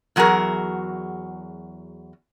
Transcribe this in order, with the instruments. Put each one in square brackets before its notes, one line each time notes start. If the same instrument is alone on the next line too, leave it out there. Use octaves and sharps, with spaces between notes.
[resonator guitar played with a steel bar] E2 F#3 F#4 G#4 A#4